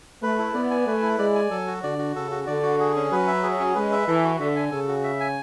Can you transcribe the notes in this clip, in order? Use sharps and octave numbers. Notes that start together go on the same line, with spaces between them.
A3 B4
E4
B3 D5
G#5
A3 B4
E4
G#3 D5
G#5
F#3 A4
F#4
D3 D5
F#4
C#3 A4
F#4
D3 D5
F#4
G#4
C#4
F#3 B4
E5
G#4
C#4
G#3 B4
E5
E3 A4
F#4
D3 E5
G#5
C#3 A4
F#4
E5
G#5